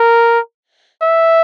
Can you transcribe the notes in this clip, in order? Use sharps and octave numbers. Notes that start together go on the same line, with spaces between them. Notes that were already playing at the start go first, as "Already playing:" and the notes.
Already playing: A#4
E5